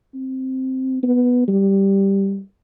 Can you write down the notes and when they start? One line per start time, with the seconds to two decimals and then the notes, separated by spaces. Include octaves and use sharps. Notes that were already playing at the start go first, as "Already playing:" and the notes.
0.14 C4
1.03 B3
1.48 G3